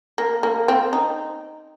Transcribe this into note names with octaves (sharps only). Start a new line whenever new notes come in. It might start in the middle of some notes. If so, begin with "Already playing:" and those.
A#3
A#3
C4
D#4